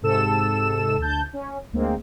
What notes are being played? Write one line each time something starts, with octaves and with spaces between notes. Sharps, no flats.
G#2 C3 A4 E6 E7
D2 A5 G6
C#4
D2 G#3 A#3 C4